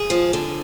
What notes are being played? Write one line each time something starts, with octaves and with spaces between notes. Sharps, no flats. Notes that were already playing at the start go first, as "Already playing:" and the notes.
Already playing: G#4
F3
D3